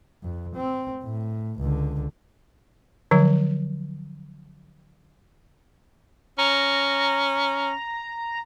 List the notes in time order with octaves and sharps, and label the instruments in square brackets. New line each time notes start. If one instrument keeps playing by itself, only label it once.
[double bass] F2
C4
A2
C#2 D3
[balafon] D3 F3 F#3
[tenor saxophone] C#4 [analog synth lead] A#5